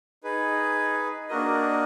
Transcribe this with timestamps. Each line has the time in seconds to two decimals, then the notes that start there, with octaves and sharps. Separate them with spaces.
0.24 D#4 G#4 B4
1.29 A#3 D4 F#4 A#4 D#5